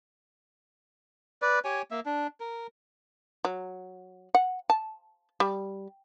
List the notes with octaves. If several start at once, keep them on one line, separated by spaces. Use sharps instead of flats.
B4 D5
G4 C#5 G#5
A#3 E5
D4
A#4
F#3
F#5
A5
G3